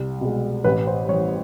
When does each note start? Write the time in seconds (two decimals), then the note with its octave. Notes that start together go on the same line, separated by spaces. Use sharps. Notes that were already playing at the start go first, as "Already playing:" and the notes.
Already playing: C2
0.21 B2 G#3
0.64 A1 B4
0.87 C5
1.08 G2 C#5
1.12 E3